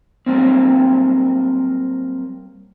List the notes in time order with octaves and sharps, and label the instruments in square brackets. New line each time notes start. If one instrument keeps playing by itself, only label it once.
[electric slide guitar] F#3 G3 A#3 C4